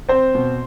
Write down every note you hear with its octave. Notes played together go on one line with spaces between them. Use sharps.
C4 C5
B2